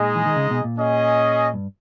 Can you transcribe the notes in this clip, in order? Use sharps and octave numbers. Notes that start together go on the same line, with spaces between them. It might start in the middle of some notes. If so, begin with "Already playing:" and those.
Already playing: A#2 G#3 D#4 G#4 D#5
E3
D#3
C#3
B2
A#2
C#4 G#4 D#5
G2